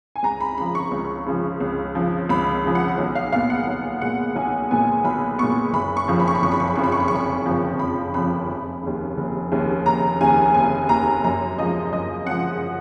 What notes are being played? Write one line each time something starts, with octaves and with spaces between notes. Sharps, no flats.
G#5
C#2 A#5
B5
C#3 F3 B5
C#6
C#2
C#3 F3
C#2
C#3 F3
C#2 B5
C#3 F3
F#5
B1
F5
A#2 G#3 B3 F5
F#5
B1
A#2 G#3 B3 F#5
B1 G#5
A#2 G#3 B3 G#5
B1 B5
A#2 G#3 B3 C#6
F#1 B5
C#6
F2 C#3 F3
B5
C#6
B5
F#1 C#6
B5
C#6
B5
F2 C#3 F3 C#6
B5
C#6
B5
C#6
F#1 B5
F2 C#3 F3
F#1 B5
F2 C#3 F3 B5
F1
D#2 C#3
F1
D#2 C#3
F1 A#5
D#2 C#3 G#5
F1 G#5
D#2 C#3 A#5
F#2 A#5
C#3 F3 G#3 D#5
F#2 D#5
C#3 F3 G#3 F#5